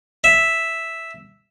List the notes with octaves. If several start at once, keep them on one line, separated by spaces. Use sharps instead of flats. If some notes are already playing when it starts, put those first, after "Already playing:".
E5